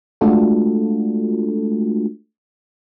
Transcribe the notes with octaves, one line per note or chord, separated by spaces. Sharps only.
G#3 A3 D4 F4 F#4 A4